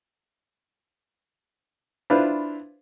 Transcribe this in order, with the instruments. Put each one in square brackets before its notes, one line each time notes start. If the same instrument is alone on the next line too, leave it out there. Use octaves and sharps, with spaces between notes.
[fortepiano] D4 E4 F4 B4 C5